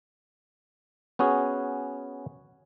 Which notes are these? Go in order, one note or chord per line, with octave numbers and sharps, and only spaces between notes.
B3 C#4 F#4 G#4